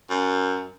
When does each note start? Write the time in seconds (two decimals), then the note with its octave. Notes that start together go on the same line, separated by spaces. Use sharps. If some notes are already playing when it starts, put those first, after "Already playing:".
0.10 F#2